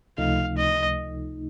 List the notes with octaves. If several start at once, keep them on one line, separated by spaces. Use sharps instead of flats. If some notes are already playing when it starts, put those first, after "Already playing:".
C#2 C3 F3 A3 D#4 F5
D#5